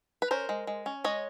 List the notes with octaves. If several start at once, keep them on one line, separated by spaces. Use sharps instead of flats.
B4
C#4 A#4 C5
G#3
G#3
C#4
G#3 C#5 D#5